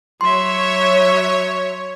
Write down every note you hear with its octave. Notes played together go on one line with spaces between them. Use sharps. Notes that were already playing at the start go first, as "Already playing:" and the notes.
F#3 C#5 E5 C6